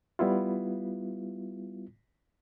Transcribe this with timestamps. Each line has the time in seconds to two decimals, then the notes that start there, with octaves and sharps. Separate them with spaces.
0.19 G3 B3 E4 F4